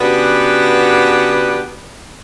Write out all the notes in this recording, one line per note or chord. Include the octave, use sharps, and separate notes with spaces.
C#3 B3 D4 F#4 G4 B4